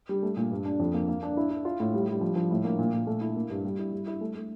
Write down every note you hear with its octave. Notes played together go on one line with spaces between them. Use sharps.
G3
A3
A#2
G2
D4
F2
A#3
A#3
D4
E4
E4
F4
A2
G3
G3
F3
F3
A2
A#3
A#2
A#2
A3
E4
A#3
G2
G3
E4
G3
E4
A3
A3